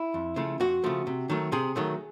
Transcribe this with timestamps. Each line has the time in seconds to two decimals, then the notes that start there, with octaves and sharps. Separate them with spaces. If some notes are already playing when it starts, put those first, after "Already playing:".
Already playing: E4
0.14 F2
0.36 C#3 F3 A3
0.60 F2 F#4
0.84 C#3 F3 A3
1.07 C3
1.29 D#3 F#3 A3
1.52 C3 G#4
1.76 D#3 F#3 A3